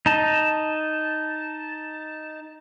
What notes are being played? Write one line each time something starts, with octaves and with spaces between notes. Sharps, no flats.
D#4 A5